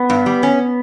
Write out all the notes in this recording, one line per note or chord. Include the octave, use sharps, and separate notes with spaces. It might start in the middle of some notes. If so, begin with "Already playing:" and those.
Already playing: B3
G2
G3
C#4